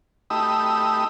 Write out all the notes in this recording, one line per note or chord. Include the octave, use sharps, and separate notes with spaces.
A3 D#4 G4 B5 D#6 E6